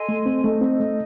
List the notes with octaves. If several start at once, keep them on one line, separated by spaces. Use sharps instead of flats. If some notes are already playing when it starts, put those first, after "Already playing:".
Already playing: A4 D#5 G#5 C6
A3
C4
A3 D#4 A4 D#5
C4
A3